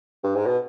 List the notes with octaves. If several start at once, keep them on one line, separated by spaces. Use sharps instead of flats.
G2
G#2
B2